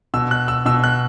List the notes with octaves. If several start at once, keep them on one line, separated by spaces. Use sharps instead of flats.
B2 E6
F#6
E6
B2 E6
F#6